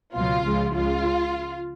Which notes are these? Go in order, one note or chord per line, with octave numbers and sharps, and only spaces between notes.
C#2 B2 F#3 F4
C#2 C#3 F3 G#3
C#2 C#3 G#3 F4